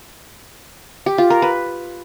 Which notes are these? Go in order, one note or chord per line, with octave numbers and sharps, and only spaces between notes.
G4
F4
A#4
B4